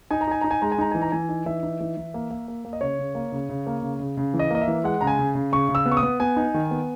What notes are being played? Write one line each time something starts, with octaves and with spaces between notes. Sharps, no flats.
D#4 G#5
A#5
D#4 G#5
D#4 A#5
G#5
G#3 A#5
G#5
D#4 A#5
E3 G#5
A#5
E3 G#5
D#4
E3 E5
D#4
E3
E3
A#3
A#3
A#3
A#3
D#5
C#3 C#5
C#3
A#3
C#3
C#3
A#3
C#3
C#3
C#3
E3
D#5
A#3 D#5
E5
E3
G#3 F#5
C#3 A#5
G#5
C#3
C#3
C#3 C#6
C#3
E6
B3
C#6
D#6
B3
B3 G#5
D#4
D#3
B3